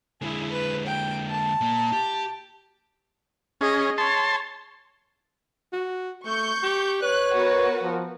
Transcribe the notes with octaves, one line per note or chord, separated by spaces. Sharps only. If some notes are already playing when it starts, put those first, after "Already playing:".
D3 G#3 E4 G#4
B4
G5
A5
A#2 A#3
G4
C#4 G#4 D#5
C#5 A5 C6
F#4
A3 C#6 G6
G4
B4 C#5 F#6
B3 F#4 A#4
F3